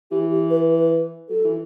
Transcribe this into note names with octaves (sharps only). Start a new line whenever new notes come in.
E3 G4
G4
B4
B4
F#3 A4
E3